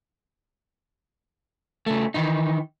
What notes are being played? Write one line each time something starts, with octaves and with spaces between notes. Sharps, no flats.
C#3 A3
D#3 E3 D#4